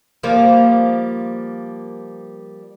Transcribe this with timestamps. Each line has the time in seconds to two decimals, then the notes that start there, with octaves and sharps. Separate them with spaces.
0.23 F3 G3 A#3